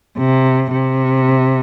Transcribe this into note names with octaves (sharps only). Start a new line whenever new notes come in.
C3
C3